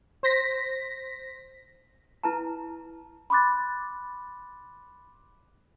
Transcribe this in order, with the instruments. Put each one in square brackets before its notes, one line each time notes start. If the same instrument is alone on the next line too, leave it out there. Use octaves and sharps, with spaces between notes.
[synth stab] C5 A#6 B6
[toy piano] E4 B4 A5 A#5
[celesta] B5 C6 D6 F#6 A6